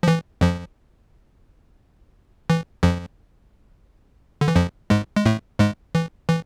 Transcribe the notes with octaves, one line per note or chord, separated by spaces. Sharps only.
F3
E3
F2 F3
E3
F2 F3
D3
E3
F2 F3
G#2 G#3
G#3
A2 A3
G#2 G#3
E3
E3